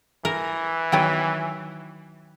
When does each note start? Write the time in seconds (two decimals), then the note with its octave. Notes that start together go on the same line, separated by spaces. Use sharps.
0.25 E3 A#4
0.92 D#3 F#3 B3 G5